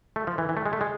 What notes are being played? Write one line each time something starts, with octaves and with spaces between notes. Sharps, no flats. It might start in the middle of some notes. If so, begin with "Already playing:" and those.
A3
F3
E3
E3
A3
G#3
A3
G#3